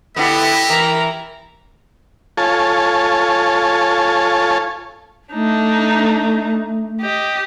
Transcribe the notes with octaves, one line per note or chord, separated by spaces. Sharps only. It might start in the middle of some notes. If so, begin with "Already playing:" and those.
D3 B3 E4 G4 D#5 E5
E3 A#4 A#5
F4 A4 C#5 G#5 A5
A3 D4 D#4
G4 D#5